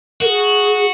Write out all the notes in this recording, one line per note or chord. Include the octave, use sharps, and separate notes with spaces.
F#4 G#4 A#4